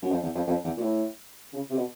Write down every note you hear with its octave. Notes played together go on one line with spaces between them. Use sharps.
F#2
F2
E2
F2
F2
E2
A#2
A2
C#3
C3
B2